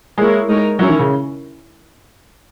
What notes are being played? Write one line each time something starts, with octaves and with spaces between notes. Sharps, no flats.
G#3 A#3 E4 A#4 C#5
G#3 D#4 A#4 C#5
F#3 C#4 E4 A#4 C#5
D#3
C#3